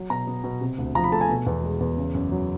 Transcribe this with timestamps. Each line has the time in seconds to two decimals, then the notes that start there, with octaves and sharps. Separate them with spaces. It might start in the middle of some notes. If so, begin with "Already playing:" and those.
Already playing: F#3
0.10 B2 A#5
0.27 B3
0.44 B2
0.61 C3
0.78 D2
0.95 F3 A#5
1.04 B5
1.12 A3 A5
1.21 G#5
1.29 B2
1.46 E2
1.63 G#3
1.80 E2
1.97 C#3
2.15 F#2
2.32 F#3